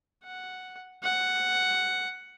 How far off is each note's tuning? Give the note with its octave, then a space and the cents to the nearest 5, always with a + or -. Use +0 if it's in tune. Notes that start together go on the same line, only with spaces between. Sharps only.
F#5 +0
F#5 +5